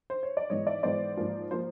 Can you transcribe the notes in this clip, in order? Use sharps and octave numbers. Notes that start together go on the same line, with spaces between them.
C5
C#5
D5
G#2 E3 G#3 B3 C#5 D#5
D5 E5
G#2 E3 G#3 B3 C5 D5
G#2 F3 A#3
F3 A#3 C5